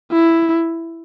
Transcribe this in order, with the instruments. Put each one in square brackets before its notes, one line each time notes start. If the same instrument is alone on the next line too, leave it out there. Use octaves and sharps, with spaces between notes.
[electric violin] E4